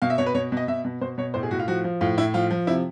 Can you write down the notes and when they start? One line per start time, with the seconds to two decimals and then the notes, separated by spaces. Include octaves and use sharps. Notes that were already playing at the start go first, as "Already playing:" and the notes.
0.02 B2 F5
0.10 E5
0.18 B2 C#5
0.26 B4
0.34 B2 C#5
0.52 B2 D#5
0.68 B2 E5
0.85 B2
1.01 B2 C5
1.18 B2 C#5
1.34 A2 C5
1.43 G#4
1.51 A2 F#4
1.59 F4
1.68 F3 F#4
1.84 F3
2.01 A2 F4
2.17 A2 E4
2.34 F3 F4
2.51 F3
2.67 C3 E4